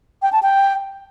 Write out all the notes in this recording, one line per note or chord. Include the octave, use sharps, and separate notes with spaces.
G5
A5
G5